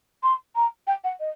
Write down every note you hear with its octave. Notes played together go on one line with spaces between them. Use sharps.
C6
A#5
G5
F#5
D#5